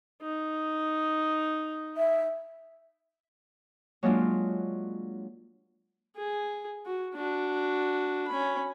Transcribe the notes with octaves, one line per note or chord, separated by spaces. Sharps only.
D#4
E5
F#3 G#3 A#3 D4 F4
G#4
F#4
D4 F#4
C#4 B5